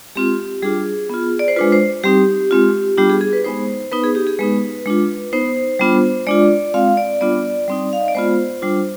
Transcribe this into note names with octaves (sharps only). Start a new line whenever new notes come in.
G#3 C4 F4 G4
G3 D4 F4 G#4
B3 F4
D5
C5
G#3 D4 F4 B4
C5
G3 C4 D#4 G4
G#3 C4 F4
G3 B3 D4 F4 G4
G#4
G#4
B4
G#3 B3 D#4 C5
B3 D#4 B4
G#4
G4
G#4
G#3 B3 D#4 B4
G#3 D4 F4
B3 D#4 C5
G3 B3 D4 F4
G#3 D4 F4 D5
G#3 C4 F4 F5
D5
G3 B3 D4 F4 D5
G3 C4 D#4
F5
D#5
D5
G#3 B3 F4 C5
G3 D4 F4